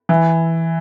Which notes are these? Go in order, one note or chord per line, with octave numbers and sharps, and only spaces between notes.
E3